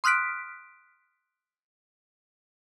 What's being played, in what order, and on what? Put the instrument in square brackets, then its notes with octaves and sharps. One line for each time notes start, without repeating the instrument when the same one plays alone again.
[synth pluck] C6 D#6 F6 F#6 B6 D7